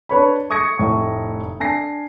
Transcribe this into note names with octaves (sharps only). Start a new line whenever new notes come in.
D4 B4 C#5 B5
C#6 D#6 G#6 A#6 C#7
F1 A2 C#6
D4 G#5 A#6 C7